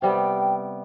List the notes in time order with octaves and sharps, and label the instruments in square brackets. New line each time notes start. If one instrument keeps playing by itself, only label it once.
[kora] C3 G3 B3 [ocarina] G5